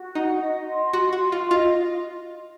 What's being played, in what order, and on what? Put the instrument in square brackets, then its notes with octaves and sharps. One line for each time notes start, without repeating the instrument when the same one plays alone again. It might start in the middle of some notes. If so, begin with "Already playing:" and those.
Already playing: [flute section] F#4
[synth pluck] D#4 [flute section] F#5
[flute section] D#5
C6
[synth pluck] F#4 [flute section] C6
[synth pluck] F#4
[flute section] C6
[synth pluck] F4
[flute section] D#5
[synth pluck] F4